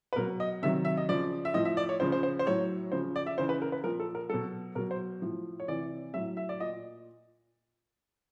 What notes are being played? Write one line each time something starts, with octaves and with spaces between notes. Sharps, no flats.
B4
B2 F#3 A#4
D#5
C3 D#3 F#3 E5
E5
D#5
C#3 F3 D5
E5
A2 F3 D#5
E5
D5
C#5
C#3 F3 C5
C5
C5
C5
A2 F#3 C#5
C#3 F3 C5
D5
E5
C#3 E3 C5
B4
A#4
B4
A#2 F3 A#4
A4
A#4
B2 F#3 A4
B2 F#3 A#4
C5
A2 F3
C#5
C3 E3 D5
A2 F#3 E5
E5
D5
A#2 D#5